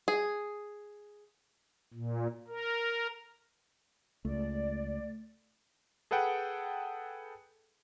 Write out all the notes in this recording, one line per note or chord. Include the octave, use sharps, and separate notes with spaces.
G#4
A#2
A#4
C#2 A3 D5
G#4 A4 B4 F#5 G5